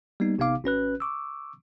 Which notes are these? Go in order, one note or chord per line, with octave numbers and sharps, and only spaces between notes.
G3 A#3 B3 D#4
A1 C3 B3 D#4 F5 D6
G#1 C#4 B4 F#6
C#6 D6 E6